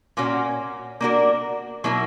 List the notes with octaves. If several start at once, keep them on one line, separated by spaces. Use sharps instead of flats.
A#2 A#3 C#4 F#4
A#3 D4 F#4 A#4
B2 F#3 A#3 E4 A#4